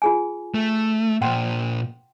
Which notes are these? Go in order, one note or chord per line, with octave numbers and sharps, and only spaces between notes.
F4 G#4 G#5
A3
A#2 C5 F#5 G5 C6